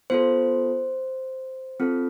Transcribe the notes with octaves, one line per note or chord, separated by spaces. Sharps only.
B3 F4 A4 C5
C4 F4 A4